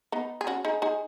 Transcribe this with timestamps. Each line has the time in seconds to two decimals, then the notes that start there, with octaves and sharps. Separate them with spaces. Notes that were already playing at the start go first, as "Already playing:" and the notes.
0.12 B3 D#4
0.41 G#4
0.47 C#4 F#4
0.65 D#4 G#4
0.82 D#4 G#4